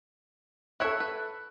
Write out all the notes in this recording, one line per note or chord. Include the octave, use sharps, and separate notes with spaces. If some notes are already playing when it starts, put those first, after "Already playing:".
E4 A4 C#5 E5 F#6
B4